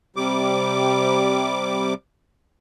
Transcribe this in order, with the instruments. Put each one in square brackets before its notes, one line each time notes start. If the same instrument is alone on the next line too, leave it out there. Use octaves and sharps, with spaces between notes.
[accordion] C3 G3 D6